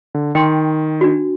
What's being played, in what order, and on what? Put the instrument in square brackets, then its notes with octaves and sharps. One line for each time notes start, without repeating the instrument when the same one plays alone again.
[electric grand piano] D3
[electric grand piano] D#3 [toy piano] G5 C6
[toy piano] D4 F#4